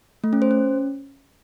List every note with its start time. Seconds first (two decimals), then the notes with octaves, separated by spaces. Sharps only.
0.24 A3
0.33 C#4
0.42 C5
0.51 C#4